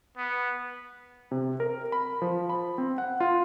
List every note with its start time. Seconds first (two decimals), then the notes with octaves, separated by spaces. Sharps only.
0.17 B3
1.31 C3
1.60 A#4
1.92 B5
2.22 F3
2.49 B5
2.78 C4
2.98 F#5
3.20 F4